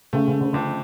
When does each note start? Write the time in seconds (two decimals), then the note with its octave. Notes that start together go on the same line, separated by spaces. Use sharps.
0.13 C#3 A3
0.27 C#3
0.33 A3
0.41 D3
0.53 F2 D3